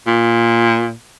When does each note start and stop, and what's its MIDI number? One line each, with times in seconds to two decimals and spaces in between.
0.07 0.93 46